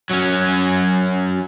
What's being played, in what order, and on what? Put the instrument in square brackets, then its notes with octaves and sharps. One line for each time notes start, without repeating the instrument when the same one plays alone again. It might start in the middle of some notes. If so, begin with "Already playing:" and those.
[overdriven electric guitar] F#3 C#4